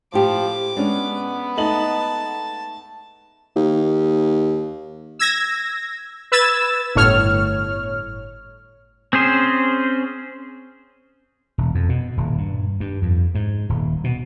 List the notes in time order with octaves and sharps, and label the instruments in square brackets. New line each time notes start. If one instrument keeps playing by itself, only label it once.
[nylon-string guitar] A2 G4 [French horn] F3 [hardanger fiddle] D6
[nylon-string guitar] G#3 [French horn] B3 [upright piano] C#4 D4
[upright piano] A3 D#4 F#7 [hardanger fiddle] A5
[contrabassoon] D#2
[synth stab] E6 G#6 A#6
B4 E6 G#6 A6 E7
G1 A2 C#5 F6
[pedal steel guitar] C4 C#4 G#4 C5
[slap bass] E1
F2
B2
D#1
G2
G2
F2
G#2
D#1
B2